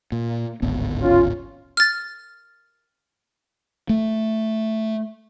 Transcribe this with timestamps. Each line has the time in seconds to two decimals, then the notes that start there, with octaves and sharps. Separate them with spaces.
0.12 A#2
0.62 D1 G#1 B3
1.02 C#4 F4
1.77 F6 A6
3.89 A3